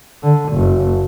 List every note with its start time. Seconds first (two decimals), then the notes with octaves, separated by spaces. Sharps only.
0.23 D3
0.53 F#1